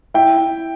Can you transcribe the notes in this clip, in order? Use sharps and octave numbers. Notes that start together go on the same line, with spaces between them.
E4 G5
E4